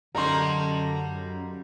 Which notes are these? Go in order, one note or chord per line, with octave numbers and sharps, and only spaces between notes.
F#2 D3 G3 A#3 D#4 A#5 C6